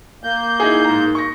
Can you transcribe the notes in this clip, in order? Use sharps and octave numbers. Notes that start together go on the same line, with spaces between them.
A#3 G6
D#4 E4 G#4
G#2 A#5
C#6 A#6